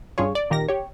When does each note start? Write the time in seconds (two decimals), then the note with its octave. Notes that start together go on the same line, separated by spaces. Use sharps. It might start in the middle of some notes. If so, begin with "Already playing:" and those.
0.18 G2 C#4 F4 G#4 C#5
0.35 D5
0.50 A#2 D#3 G4 A#4 A#6
0.69 G4 C#5